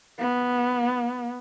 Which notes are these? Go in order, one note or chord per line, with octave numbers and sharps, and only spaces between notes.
B3